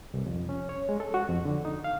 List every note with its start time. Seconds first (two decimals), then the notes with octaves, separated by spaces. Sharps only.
0.14 C2
0.26 F2
0.49 C#4
0.69 C#5
0.89 G#3
1.00 A4
1.14 F#4
1.29 F2
1.45 D3
1.65 D#4
1.84 F5